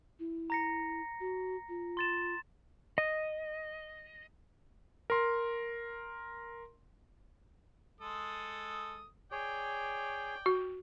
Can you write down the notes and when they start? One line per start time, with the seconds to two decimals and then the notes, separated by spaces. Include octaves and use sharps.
0.19 E4
0.50 A#5 A#6 C#7
1.20 F#4
1.69 F4
1.97 C6 A6 E7
2.98 D#5
5.10 A#4 C6
8.01 G#3 A4 D#6
9.32 G#4 C#5 D5 G5
10.46 F#4